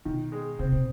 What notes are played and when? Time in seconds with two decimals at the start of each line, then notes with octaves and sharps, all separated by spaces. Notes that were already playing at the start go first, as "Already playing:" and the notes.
0.05 B2 D#3
0.32 G#3
0.59 C3 C4
0.72 B2